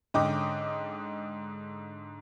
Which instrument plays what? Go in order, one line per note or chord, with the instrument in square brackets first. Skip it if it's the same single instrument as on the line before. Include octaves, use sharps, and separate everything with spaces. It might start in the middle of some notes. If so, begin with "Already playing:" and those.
[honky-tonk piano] G#2 D3 C#4 D#5 G5 D6